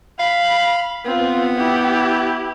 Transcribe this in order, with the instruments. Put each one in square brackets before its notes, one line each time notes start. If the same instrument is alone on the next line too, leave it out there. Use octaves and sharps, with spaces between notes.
[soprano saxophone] F5 [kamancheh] B5
[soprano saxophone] B3 [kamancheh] C4 F4
[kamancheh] E4 G4